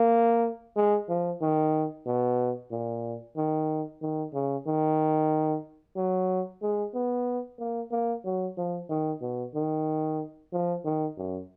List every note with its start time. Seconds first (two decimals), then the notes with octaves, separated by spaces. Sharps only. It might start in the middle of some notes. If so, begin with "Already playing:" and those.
Already playing: A#3
0.76 G#3
1.09 F3
1.41 D#3
2.06 B2
2.71 A#2
3.37 D#3
4.02 D#3
4.34 C#3
4.67 D#3
5.96 F#3
6.62 G#3
6.94 B3
7.59 A#3
7.91 A#3
8.25 F#3
8.57 F3
8.90 D#3
9.21 B2
9.55 D#3
10.52 F3
10.85 D#3
11.18 F#2